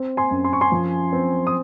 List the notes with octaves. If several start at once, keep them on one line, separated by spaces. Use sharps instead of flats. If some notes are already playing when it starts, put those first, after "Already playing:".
Already playing: C4
G#5 C6
F#2
C6
C#6
G#5 C6
F3
C4
D#6